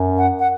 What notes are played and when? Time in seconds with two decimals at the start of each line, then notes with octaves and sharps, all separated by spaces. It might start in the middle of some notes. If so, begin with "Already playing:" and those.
Already playing: F#2
0.18 F#5
0.39 F#5